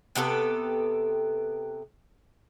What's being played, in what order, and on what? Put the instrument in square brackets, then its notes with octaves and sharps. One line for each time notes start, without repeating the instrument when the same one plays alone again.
[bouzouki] C3 B3 G4 A4